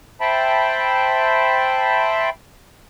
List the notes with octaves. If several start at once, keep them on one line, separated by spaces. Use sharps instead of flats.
C5 E5 G5 A5 B5